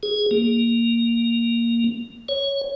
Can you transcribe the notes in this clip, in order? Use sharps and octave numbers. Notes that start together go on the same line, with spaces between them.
G#4
A#3
C#5